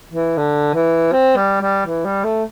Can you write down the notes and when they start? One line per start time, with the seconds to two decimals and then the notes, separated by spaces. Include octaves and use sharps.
0.12 E3
0.37 D3
0.74 E3
1.12 C4
1.36 G3
1.62 G3
1.86 E3
2.05 G3
2.24 A3